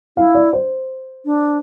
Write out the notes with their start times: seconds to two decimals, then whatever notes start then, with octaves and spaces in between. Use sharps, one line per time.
0.17 E4 F5
0.35 D5
0.53 C5
1.25 D4